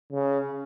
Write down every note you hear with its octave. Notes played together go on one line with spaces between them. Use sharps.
C#3